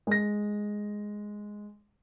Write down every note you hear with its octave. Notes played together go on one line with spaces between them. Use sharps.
G#3 A#6